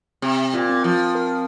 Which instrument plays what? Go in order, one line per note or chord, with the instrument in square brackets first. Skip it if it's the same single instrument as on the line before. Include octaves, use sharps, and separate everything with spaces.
[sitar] C3 [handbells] C4
[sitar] A#2
[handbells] C4
[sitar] F3
[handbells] A#4